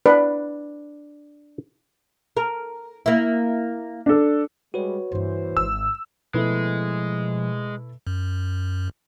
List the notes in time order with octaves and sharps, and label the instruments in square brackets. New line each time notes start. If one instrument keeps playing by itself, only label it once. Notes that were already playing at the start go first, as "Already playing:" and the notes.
[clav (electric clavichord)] D4 [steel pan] B4
[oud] A#4
A#3 E4
[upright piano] D4 A4
[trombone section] G3 G#3 [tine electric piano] F#4 B4 C#5
[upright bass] G2 A#3 [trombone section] E3 C5
[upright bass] G#1 G#2 [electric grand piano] E6
[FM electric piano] B2 [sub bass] F3 [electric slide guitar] G#3 [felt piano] A3 E4 B4
[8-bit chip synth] F#2